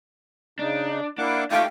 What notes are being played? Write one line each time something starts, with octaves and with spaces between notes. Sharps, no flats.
C#3 D4 D#4
A#3 D4 E4 F#5 D6
A3 D#4 F4 G4 F5 G5 C#6 D6